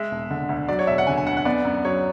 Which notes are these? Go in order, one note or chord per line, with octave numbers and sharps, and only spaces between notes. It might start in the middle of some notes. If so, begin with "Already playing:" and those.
Already playing: G#3 E5
E1
D3
D2
F#3 D5
C#5
E1 E5
F#5
D3 G#5
G#5
D2 F#5
F#5
B3 D5
F#2
F#3 C#5